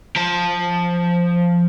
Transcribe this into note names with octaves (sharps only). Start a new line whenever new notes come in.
F3 A5